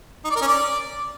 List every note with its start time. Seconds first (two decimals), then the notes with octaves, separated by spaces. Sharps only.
0.25 D#4
0.30 D5
0.36 A#4
0.42 C#4
0.47 D5